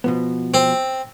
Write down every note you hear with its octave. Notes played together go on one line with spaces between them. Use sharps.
B2 F3 B3
C4